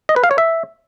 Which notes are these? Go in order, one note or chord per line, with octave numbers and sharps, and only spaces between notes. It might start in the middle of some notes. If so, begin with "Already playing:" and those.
D#5
B4
F5
C#5
E5